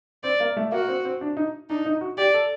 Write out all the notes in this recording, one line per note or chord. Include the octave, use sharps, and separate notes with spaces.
C4 D5
A#3
A3
A#3 F#4
C4
C4
D4
D#4
D4 D#4
D#4
F#4
G4 D5
A4